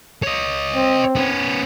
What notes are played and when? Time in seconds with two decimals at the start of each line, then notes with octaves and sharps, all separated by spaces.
0.23 C#5 D#5
0.75 C4
1.16 B3 C#4